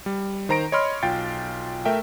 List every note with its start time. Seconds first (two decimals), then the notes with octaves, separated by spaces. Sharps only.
0.06 G3
0.49 D#3 C5 A#5 A#6 D7
0.72 C#5 D#5 B5 C6 F6
1.03 B1 F4 F5 G5 A6
1.85 A3 A#4 E5 G5